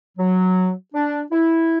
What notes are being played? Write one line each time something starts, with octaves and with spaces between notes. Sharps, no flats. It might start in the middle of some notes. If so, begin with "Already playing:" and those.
F#3
D4
E4